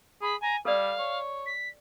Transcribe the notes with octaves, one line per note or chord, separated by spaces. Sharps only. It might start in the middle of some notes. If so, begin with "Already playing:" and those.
G#4 B5
G#5 A#5
G3 A4 D5 F5
C#5
B6